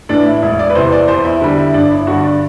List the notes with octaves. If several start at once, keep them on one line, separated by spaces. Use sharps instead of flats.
A2 E3 D4
E4
E1 E4
D5
B4
E2 C3 E3 B3 C5
D5
E2 C5
E4
D3 G3
E4
G1 D4
E4
G2 D3 F#4
D4